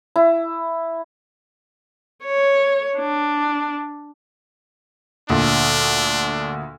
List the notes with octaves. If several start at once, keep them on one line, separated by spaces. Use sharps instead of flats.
E4
C#5
D4
D2 A#2 D4